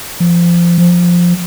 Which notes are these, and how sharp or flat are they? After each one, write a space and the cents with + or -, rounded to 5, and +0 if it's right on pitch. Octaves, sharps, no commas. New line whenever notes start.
F3 -20
F3 +5